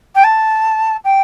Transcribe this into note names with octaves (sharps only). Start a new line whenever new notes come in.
G5
A5
G5